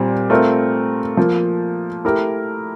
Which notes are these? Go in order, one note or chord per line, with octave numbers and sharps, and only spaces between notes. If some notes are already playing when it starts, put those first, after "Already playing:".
Already playing: A#2 G3 C4
A3 C4 F4 A#4
F3 A#3 F4
A3 E4 G4 A#4